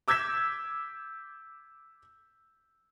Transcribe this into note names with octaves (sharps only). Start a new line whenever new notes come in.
D6 E6 G6 G#6 B6 E7